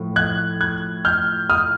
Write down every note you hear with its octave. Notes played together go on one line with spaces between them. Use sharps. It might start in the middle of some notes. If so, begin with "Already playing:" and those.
Already playing: A2 F3 A3
F#6 G#6
F#6 G#6
F6 G6
D#6 F6